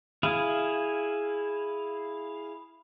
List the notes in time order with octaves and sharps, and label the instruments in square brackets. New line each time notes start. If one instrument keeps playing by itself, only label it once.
[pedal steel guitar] E4 G#4 F5